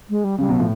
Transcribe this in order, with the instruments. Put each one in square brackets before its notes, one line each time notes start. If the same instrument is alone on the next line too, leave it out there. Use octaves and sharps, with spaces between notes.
[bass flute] G#3
G3
[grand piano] C#3 [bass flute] G3
[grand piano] B2 [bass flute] F#3
[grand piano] A2 [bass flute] F3